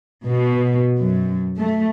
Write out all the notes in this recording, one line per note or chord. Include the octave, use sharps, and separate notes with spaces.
B2
F#2
A3